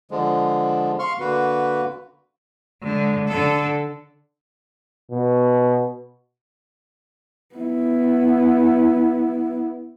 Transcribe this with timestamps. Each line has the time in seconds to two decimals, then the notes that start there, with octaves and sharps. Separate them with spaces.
0.11 D3 F3 G#3
0.99 F5 C6 C#6 F6
1.20 D3 A#3 F#4 B4
2.83 D3 G#3
3.27 D3 A4
5.11 B2
7.55 B3 E4